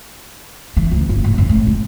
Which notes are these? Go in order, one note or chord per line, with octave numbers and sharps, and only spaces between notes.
E3
D2
G1
A1
F2
A2
A3